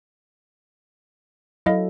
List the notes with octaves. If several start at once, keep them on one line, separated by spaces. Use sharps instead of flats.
F#3 E4 A4 D#5 F5